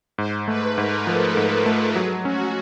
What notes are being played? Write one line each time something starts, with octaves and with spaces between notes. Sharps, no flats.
G#2 C5
A3 B4
G#2 A#4
F3 A4
G#2
A3
F#3 G#4
C#4 F#4